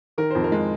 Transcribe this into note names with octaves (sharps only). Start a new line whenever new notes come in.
D#3 A#4
F2 C5
A#4
G#3